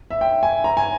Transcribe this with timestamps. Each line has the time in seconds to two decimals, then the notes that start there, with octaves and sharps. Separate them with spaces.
0.11 E5
0.21 G5
0.43 G#5
0.64 A#5
0.77 G#5